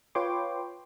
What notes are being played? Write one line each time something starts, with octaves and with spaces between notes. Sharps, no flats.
F4 B4 C#5 G5 C6 D6